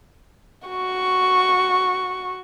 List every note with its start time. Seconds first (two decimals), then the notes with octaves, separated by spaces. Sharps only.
0.68 F#4 C#6